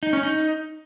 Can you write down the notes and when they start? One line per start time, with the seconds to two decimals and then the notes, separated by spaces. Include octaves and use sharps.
0.03 D#4
0.13 C#4
0.23 D#4